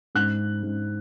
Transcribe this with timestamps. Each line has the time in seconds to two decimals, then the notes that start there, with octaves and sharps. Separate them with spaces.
0.15 G#2 F#6
0.63 G#2